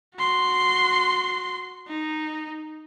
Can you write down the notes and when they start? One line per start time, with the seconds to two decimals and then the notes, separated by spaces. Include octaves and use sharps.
0.16 F#4 C6
1.88 D#4